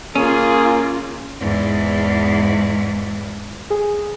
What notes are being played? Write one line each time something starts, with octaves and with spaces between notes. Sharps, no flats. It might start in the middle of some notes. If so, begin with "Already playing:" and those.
A#3 C#4 F4 G#4
E2 G#2
G#4